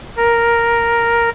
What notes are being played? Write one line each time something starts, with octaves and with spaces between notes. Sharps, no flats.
A#4